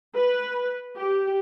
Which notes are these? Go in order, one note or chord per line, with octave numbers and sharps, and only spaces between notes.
B4
G4